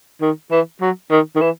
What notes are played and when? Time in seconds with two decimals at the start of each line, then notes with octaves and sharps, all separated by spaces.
0.21 D#3
0.51 E3
0.81 F#3
1.11 D#3
1.36 D#3
1.41 E3